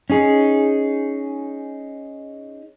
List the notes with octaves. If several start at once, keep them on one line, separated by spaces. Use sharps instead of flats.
C#4 D#4 G#4